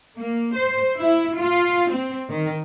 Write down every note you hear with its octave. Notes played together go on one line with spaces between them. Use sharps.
A#3
C5
E4
F4
C4
D#3